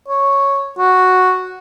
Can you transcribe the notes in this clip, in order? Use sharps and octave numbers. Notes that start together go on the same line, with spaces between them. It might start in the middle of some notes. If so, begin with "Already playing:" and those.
C#5
F#4